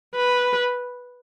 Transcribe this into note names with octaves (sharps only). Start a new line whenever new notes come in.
B4